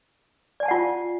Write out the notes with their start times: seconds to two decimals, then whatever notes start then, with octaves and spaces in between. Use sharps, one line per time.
0.60 D5
0.63 G#5
0.66 A5
0.68 F#5
0.71 F4